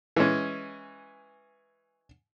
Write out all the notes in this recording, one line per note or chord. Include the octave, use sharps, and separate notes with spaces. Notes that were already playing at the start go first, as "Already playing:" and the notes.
E3 G#3 C#4